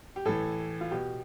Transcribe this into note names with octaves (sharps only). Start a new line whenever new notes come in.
G4
A2 E3 A4
F4
B2 G4